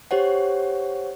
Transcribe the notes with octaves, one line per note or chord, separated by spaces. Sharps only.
G4 C5 C#5 F#5